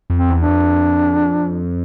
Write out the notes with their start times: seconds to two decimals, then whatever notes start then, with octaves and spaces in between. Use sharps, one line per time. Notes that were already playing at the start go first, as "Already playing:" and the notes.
0.10 F2
0.16 C4
0.29 E2
0.42 D4
0.48 F2